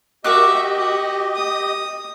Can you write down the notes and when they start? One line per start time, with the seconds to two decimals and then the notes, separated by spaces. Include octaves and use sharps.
0.24 F#4 G4 A#4 D#5 E5 D6 F#6
0.77 F#4
1.35 D#6